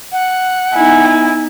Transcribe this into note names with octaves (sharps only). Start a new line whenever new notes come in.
F#5
B3 D#4 E4 G#5